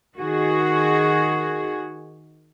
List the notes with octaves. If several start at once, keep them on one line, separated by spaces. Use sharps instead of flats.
D#3 F#4 G#4